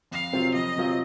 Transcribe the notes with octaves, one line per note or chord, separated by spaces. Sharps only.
F2 F5
C3 F#3 C4 F4
F2 D#5
C3 F#3 C4 F4